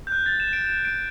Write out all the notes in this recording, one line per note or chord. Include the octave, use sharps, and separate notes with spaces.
G6
F#6
A6
E7
D7
E7
D7